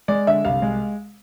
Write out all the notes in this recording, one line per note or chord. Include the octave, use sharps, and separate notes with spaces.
G#3 D5
D3 E5
C2 F5
G#3